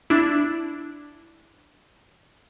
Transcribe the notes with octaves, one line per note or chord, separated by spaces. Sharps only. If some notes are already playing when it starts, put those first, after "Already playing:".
D4 E4